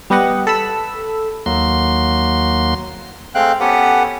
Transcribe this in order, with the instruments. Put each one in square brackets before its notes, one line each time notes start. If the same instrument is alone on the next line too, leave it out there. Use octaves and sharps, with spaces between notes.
[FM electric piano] G3 B3 G4 D#5 F#5
A4 B5 E6
[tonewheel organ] D#2 F#3 A#3 C6
[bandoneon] G#3 A3 C4 F5 G5 F#6
B3 C#4 G4 A4 B4 F#5